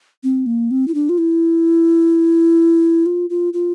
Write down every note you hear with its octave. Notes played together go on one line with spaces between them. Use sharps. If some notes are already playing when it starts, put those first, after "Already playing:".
C4
A#3
C4
E4
D4
F4
E4
F4
F4
F4